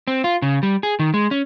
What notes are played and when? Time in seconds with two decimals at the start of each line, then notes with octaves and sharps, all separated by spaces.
0.07 C4
0.24 F4
0.42 C#3
0.63 G3
0.83 G#4
0.99 D#3
1.14 G#3
1.31 C#4